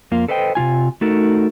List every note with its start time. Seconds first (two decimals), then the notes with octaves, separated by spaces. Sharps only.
0.11 F2 A#3 F4
0.28 A4 B4 C5 D#5 G5
0.55 C3 D#3 F4 G#5
1.01 A3 D#4 F#4 A4 A#4